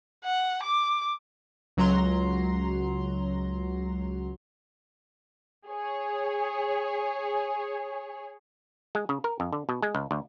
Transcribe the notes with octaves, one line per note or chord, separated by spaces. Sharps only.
F#5
D6
C#2 F#3 A#5 C6
G#4 C#5
G#3
C#3
A#4
F2
D3
B2
G#3
C#2
D2